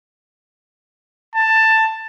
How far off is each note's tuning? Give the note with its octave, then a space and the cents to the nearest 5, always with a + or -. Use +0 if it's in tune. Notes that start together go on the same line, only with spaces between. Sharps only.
A5 +10